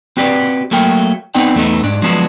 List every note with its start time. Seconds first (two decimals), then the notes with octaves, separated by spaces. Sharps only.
0.17 C4 F#4 G4 B4 D5
0.71 F#3 A3 A#3 A#4 G5
1.35 B3 C4 D#4 D5 G5
1.55 E2 A3 B3 D#4
1.83 G#2 D4
2.02 F3 F#3 G#3 B3 D4